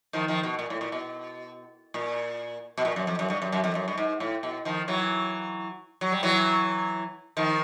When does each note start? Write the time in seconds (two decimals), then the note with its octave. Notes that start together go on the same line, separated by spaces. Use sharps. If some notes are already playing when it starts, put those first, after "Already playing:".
0.13 D#3 F3
0.28 D#3 F3
0.43 B2
0.59 A#2
0.70 A2
0.81 A#2
0.92 B2
1.94 A#2
2.77 B2
2.85 A#2
2.96 F#2
3.07 F2
3.19 F#2
3.30 G2
3.42 F#2
3.52 F#2
3.64 F2
3.75 F#2
3.88 G2
3.98 G#2
4.20 A2
4.43 B2
4.65 D#3 F3
4.88 E3 F#3
6.01 F#3
6.12 G3
6.23 E3 F#3
7.37 D#3 F3